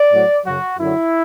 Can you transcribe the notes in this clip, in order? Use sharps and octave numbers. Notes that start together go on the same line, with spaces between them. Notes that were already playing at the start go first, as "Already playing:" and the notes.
Already playing: D5
A2 F#3
F#2 C#3 F#3 F#4
F#2 D3 F#3 E4